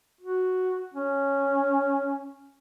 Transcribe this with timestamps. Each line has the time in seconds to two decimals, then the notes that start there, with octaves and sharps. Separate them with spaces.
0.21 F#4
0.94 C#4